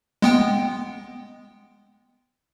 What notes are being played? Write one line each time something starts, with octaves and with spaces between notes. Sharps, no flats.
G#3 B3 G5